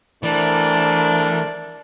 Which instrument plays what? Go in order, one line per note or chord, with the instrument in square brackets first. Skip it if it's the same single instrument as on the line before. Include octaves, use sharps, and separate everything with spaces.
[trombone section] C2 A3 A#4 [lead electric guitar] E3 [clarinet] D4 [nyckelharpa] C5 D5